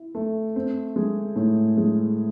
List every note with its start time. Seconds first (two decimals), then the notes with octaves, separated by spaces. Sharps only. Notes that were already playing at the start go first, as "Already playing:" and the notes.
Already playing: E4
0.15 A3
0.56 C4
0.96 G#3
1.36 A2
1.77 G#3